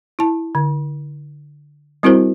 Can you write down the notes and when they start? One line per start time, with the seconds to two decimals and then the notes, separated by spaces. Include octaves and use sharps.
0.19 E4 A5
0.55 D3
2.03 G3 C4 E4 F#4 A#4 C5